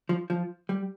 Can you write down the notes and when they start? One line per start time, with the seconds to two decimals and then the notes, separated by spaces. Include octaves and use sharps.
0.09 F3
0.30 F3
0.69 G3